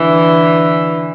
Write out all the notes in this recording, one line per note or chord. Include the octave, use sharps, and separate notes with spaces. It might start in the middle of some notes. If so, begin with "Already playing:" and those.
Already playing: D3 E3